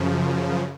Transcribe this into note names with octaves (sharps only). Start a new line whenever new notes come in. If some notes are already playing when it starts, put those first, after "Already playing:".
Already playing: F#2 C#3 F3